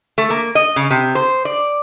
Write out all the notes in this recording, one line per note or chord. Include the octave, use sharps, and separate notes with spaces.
A3
A#3
D#5
C#3
C3
C5
D5